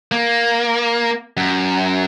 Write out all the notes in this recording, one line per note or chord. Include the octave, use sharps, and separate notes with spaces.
A#3
F#2